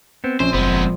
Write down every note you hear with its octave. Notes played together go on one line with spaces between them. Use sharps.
B3 C4
A#1 C4 C#4 A4 C5
F#1 G#3 B3 C5